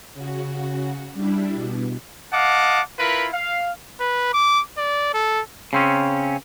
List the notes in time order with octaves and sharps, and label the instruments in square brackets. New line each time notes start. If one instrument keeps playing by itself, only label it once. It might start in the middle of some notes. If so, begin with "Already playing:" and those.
[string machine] C#3 F#4
G3 D4 E4
B2
[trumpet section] D#5 F5 F#5 A5 D6
E4 F4 A#4 B4 B5
F5
[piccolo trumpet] B4
D6
D5
A4
[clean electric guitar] C#3 C4 C#4